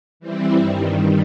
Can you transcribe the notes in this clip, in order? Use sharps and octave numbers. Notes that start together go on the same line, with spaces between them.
E3 G3 C4 E4
G2 D#3 G3